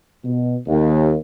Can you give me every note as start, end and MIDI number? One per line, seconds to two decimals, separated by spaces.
0.24 0.57 47
0.67 1.16 39